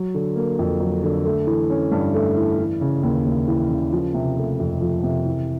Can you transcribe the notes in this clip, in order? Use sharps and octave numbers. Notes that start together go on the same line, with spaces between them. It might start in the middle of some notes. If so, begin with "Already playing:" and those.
Already playing: F#3
D3
A#3
F2
F#3
D3
A3
E3
C#4
G2
A3
E3
E3
C#3
D#2
D#2
E3
C#3
F3
C3
A3
F2
F3
C3
E3